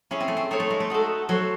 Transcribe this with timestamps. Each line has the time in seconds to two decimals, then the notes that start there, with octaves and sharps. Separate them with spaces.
0.11 C#4 E4 G#4 C#5
0.20 C4
0.28 A3
0.37 C4
0.51 C4 D#4 A4 C#5
0.60 A3
0.70 G#3
0.80 A3
0.90 D#4 F#4 A4
1.29 F#3 F#4 A4 C5